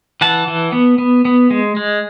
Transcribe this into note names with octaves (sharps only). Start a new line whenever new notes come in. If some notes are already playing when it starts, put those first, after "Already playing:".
E3 F#5 A5
E3
B3
B3
B3
G#3
G#3